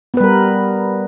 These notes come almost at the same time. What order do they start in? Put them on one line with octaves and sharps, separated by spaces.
B3 B4 G3 A#4